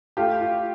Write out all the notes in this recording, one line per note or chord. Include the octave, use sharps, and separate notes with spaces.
A3 F4 G4
F4